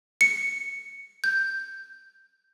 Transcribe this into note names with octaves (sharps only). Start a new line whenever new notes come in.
C#7
G6